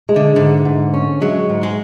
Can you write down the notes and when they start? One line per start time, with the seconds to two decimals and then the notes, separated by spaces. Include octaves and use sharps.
0.09 G#3
0.16 D3
0.36 G#2 D3
0.65 G#2
0.94 C#4
1.21 F#3 G#3
1.49 G#2
1.63 G#3